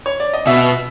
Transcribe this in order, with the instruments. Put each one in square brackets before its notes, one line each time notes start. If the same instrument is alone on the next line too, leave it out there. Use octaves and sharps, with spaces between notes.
[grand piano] C#5
D5
D#5
[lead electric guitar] B2 [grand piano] E5